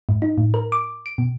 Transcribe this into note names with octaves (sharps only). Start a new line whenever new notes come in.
G#2
D#4
A2
A#4
D6
D7
B2